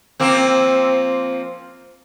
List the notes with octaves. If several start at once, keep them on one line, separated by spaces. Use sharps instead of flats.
F3 A#3 C4